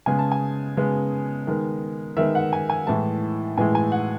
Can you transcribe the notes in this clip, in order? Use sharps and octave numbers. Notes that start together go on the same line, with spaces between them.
C#3 G#3 B3 G#5
A5
G#5
C#3 G#3 B3
D#3 G#3 B3
D#3 G#3 B3 E5
F#5
G#5
G#5
A2 E3 G#3 A5
A2 E3 G#3 G#5
G#5
F#5